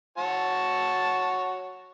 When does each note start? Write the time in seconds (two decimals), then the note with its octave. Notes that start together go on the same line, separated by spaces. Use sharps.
0.18 F#4 C#5 A5